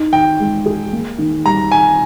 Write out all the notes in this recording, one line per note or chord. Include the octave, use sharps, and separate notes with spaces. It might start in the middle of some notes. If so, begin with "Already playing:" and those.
Already playing: D#4
D#3 G5
G#3
G#4
A#3
D#3
G3 A#5
D#3 G#5